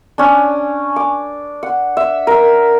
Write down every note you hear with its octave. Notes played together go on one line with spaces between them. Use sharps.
C#4 D4
D6
F#5
E5
A#4 E5